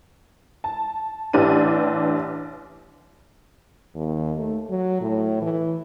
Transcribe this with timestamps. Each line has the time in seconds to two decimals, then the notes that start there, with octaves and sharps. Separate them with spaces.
0.64 A5
1.33 A1 E3 D4 G4 D#7
3.95 D#2
4.38 A3
4.70 F#3
5.01 A2
5.42 E3